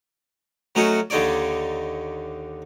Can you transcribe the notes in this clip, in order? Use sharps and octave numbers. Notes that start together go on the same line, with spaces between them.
F#3 A3 C#4 D#4 F#4 C#5
D#2 D3 D#4 C#5 D5